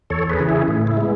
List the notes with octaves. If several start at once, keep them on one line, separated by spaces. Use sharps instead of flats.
E2 A4 C#5
G#4 B4
C#3 E3
E4 G#4
A2
E4
G#3 B3